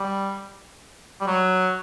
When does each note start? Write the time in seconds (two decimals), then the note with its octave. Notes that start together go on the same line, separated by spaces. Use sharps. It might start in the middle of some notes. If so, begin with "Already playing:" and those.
Already playing: G3
1.21 G3
1.27 F#3